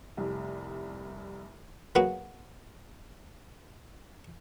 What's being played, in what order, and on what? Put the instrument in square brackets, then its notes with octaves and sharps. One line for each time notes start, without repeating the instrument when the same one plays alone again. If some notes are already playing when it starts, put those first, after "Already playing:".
[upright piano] F1 C2
[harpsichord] F#3 A#3 B3 F#4 G#4